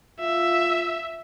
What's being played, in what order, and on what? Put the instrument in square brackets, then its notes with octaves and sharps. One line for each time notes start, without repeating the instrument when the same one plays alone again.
[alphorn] F4 [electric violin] E5